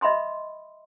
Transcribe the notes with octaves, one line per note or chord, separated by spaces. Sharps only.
D#5 E5 B5 C6 D#6